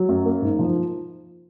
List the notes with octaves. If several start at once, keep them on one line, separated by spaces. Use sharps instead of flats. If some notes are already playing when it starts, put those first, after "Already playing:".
Already playing: F#3
F#2
A#3
G#2
F3